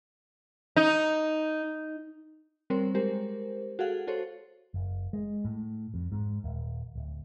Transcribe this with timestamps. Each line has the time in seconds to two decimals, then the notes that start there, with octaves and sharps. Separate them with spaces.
0.76 D#4
2.70 G3 C4 A#4 C5 C#5
2.95 G#3 G4 A#4 C5
3.79 F#4 G#4 A4 F5 F#5
4.07 F#4 A4 C5 C#5
4.74 F#1
5.13 G#3
5.45 A2
5.94 F2
6.12 G#2
6.44 D#1
6.95 D1